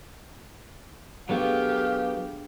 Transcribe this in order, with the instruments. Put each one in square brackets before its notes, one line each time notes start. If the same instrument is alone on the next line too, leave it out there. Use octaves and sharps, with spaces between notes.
[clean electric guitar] F#3 B3 [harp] A3 D4 G#4 [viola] G4 [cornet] F5